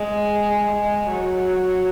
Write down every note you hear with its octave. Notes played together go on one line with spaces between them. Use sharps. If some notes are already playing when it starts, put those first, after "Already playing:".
Already playing: G#3
G#3
F#3